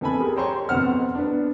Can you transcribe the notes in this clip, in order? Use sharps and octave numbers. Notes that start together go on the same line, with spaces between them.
F2 B3 A4 G#5 B5
G4 G#4 A#4
C5 C#5 G5 A#5 C6 C#6
F2 B2 B3 C5 F#5 F6
B3 D4